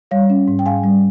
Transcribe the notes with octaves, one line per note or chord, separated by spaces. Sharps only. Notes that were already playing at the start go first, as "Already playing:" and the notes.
G3 C#5 F5
C#4
G#2
G5
G#2 F5 G#5
G3